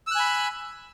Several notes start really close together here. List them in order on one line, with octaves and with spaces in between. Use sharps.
E6 F#6 G#5 B5